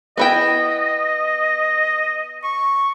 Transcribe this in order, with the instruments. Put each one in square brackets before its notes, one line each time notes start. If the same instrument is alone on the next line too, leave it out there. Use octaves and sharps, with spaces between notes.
[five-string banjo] B3 E4 G5 [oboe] D#5
[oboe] C#6